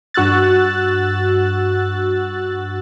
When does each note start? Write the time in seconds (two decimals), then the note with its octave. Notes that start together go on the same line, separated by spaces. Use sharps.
0.14 G2 F#4 E6 F#6 A6